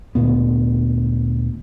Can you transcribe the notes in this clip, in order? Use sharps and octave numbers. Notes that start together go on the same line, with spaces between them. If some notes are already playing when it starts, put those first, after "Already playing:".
D2 A#2 B3